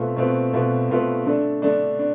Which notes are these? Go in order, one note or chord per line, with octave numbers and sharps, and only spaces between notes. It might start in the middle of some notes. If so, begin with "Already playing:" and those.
Already playing: B2 A3 C4 F4 B4
B2 A3 C4 F4 B4
B2 A3 C4 F4 B4
B2 A3 C4 F4 B4
D3 A3 D4
D3 A3 D4
D4